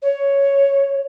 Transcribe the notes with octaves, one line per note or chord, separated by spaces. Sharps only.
C#5